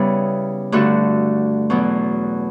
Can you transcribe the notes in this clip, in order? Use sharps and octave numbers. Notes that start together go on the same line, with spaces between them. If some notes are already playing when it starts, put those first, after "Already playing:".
Already playing: C#3 G3 B3 E4
G2 D3 A3 D4 F#4
E2 B2 F#3